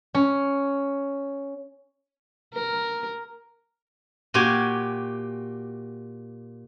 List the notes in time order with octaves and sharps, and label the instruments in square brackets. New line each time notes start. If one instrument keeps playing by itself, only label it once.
[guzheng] C#4
[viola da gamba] A#4
[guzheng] A#2 F#4 G4 G#5